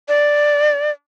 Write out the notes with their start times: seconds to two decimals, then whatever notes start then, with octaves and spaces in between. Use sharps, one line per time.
0.08 D5